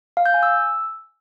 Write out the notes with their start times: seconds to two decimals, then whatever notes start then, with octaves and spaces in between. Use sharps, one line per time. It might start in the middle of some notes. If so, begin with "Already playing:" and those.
0.17 F5
0.26 G6
0.34 G#5
0.43 E6